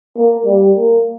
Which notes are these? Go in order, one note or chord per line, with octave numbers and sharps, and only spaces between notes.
A#3
G3
A#3